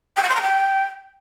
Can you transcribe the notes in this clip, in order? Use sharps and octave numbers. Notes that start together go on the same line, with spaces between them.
G5
F#5
C6
A#5
G5